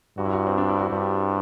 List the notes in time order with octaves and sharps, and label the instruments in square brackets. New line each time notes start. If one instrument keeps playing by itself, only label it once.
[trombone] G2 [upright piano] F#4
[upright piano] E4
F#4
C4
D4
E4
F#4
[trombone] G2 [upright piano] G4